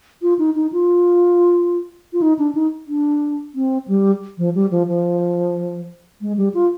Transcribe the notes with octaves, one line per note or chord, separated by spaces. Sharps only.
F4
D#4
D#4
F4
F4
D#4
D4
D#4
D4
C4
G3
F3
G3
F3
F3
G#3
G3
F4